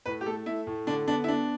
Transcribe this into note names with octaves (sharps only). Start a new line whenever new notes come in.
A2 B4
G4
A3 A4
A3 E4
A2
D3 D4
B3 D4
E4
B3 D4